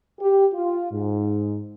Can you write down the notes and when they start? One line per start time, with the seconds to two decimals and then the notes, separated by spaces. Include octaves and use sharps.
0.20 G4
0.54 F4
0.92 G#2